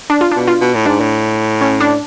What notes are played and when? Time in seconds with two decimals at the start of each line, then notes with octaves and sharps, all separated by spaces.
0.10 D4
0.21 F4
0.32 B2 D4
0.48 F4
0.61 B2
0.74 A2
0.86 G#2 D4
1.00 A2
1.61 C#4
1.80 D4